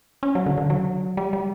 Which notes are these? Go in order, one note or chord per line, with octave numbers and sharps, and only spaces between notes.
C#4
F#3
D3
D3
F#3
G3
G3